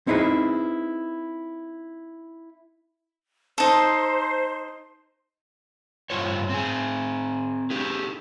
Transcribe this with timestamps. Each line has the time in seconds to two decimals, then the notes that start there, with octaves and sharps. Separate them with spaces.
0.07 C4 D#4 E4 G#4 B4
3.58 D#4 A4 C5
6.10 G2 F4 C5 C#5
6.49 C4 G#4
7.70 D4 G4 G#4